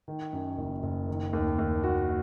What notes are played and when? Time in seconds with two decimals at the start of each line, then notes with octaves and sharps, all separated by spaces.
0.08 D#3
0.33 F#2
0.58 F#1
0.83 F#1
1.08 D#3
1.33 D#2
1.59 D#2
1.83 F#4